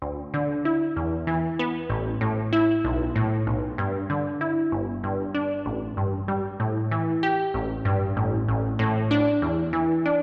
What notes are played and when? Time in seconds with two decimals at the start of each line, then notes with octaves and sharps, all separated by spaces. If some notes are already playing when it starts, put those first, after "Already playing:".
0.02 D2
0.34 D3
0.65 E4
0.96 E2
1.27 E3
1.59 B3
1.90 A1
2.21 A2
2.53 E4
2.85 B1
3.16 A2
3.47 B1
3.78 G2
4.10 D3
4.41 E4
4.72 G1
5.04 G2
5.35 D4
5.66 A1
5.97 G2
6.28 G3
6.60 A2
6.91 E3
7.23 G4
7.54 A1
7.85 G2
8.17 A1
8.48 A1
8.79 A2
9.11 D4
9.42 E2
9.73 E3
10.06 D4